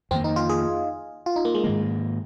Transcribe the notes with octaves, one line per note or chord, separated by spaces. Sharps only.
F2 D#3 A#3 C4
D#4
F4
G#4
F4
D#4
A#3
G#3
G#2 D#3 A#3